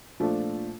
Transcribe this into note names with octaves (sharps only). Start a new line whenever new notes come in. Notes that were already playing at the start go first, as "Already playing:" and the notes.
A#2 F3 A3 D4 F4